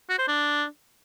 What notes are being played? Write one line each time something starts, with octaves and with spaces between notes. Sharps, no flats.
F#4
C5
D4